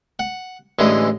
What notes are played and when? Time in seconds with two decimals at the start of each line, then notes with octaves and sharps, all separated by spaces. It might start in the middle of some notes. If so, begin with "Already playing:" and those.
0.19 F#5
0.79 A1 D3 E3 G#3 D#6